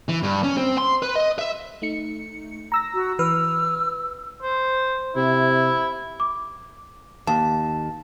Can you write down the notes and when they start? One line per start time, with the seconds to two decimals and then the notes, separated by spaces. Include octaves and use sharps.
0.09 E3
0.23 G2
0.44 C#4
0.58 C4
0.78 C6
1.02 B4
1.16 D#5
1.39 E5
1.82 A3 D#4 C#7
2.72 A#5 E6 A#6
2.94 F#4
3.19 E3 B4 E6 F6
4.42 C5
5.16 C3 E4
6.20 D6
7.27 D#2 A5